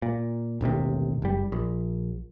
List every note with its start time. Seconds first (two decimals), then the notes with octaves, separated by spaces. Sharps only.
0.02 A#2
0.61 E1 A1 D#2 C3
1.22 F#1 G3
1.52 A#1